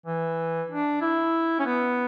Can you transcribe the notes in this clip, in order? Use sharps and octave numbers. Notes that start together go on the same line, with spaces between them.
E3
D4
E4
C#4
B3